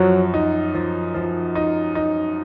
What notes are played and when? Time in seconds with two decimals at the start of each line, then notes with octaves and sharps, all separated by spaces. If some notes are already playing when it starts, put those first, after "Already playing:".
Already playing: F#2 F3 F#3
0.34 D#4
0.74 F3
1.14 F3
1.55 D#4
1.95 D#4